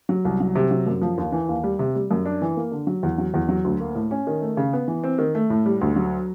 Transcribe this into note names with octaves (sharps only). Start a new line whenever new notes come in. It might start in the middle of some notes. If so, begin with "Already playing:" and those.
F#3
C2
F#3
C3
F#3
F#2
F3
D#2
E3
D#2
G3
C3
G3
F#2
D4
E3
A#3
D3
F#3
E2
F#3
E2
F#3
D2
A#3
A2
C#4
D#3
A3
C#3
B3
E3
C4
D#3
A3
A2
G3
D2
F#3